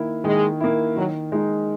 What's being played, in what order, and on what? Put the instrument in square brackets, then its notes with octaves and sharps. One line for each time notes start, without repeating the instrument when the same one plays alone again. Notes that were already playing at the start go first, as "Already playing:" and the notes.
Already playing: [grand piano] D#3 A#3 E4
[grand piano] D#3 [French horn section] G#3
[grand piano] A#3 E4
[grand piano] D#3 [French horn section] F#3
[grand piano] G#3 D#4